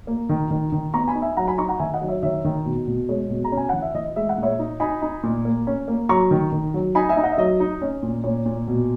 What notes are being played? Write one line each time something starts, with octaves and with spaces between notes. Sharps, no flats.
A#3
D#3
D#3
D#3
B3 A#5 C#6
G#5 B5
D#4
E5 G#5
F#3 F#5 A#5
G#5 B5
D#4 A#5 C#6
F#5 A#5
D#3 E5 G#5
D#5 F#5
F#3
C#5 E5
D#3 C#5 E5
D#3
B2
B2
G#3 C#5
B2
A#5
C#4
G#5
E3 F#5
E5
E3 D#5
G#3 E5
F#5
A#2
C#5 E5
D#4
D#4 G#5 B5
D#4
A#2
A#3
C#4
A#3
F#3 A#5 C#6
D#3
D#3
F#3
D#4 G#5 B5
E5 G#5
D#4
D#5 F#5
E5
F#3 D#5
D#4
C#4
A#2
A#2 C#5
A#2
B2